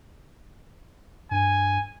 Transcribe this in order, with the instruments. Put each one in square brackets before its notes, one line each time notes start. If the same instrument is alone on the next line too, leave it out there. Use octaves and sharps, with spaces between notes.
[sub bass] G2 [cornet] G#5